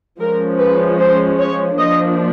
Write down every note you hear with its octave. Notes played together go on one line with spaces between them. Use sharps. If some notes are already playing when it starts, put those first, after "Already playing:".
F3 G#3 C#4 A#4
B4
C5
C#5
F3 A#3 D4 D#5